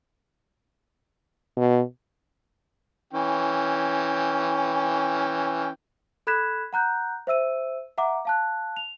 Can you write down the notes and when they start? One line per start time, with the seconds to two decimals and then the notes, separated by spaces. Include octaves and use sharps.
1.57 B2
3.14 E3 C#4 G5
6.27 A4 B5 F#6 G#6 B6 E7
6.73 F#5 A#5 F#6 G6
7.27 C5 E5 E6 D#7
7.98 E5 F#5 A#5 D6
8.25 F5 A5 F#6
8.77 F7